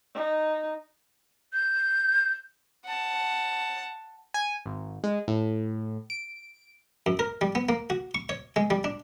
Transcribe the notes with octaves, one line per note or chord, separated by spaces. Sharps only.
D#4
G6
F#5 A5
G#5
G#1
G#3
A2
D7
F#2
A#4
G3
B3
A#3
F#4
C#6
C#5
G#3
G3
D4